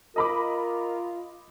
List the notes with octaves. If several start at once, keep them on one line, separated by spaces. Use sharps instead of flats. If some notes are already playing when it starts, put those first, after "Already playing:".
F4 A#4 D#5 B5 D6